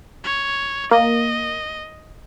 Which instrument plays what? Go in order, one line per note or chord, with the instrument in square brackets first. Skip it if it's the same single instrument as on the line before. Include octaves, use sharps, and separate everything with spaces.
[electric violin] C#5
[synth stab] A#3 [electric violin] D#5